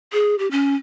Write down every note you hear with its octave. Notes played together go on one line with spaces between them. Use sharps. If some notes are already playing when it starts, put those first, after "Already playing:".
G#4
G4
C#4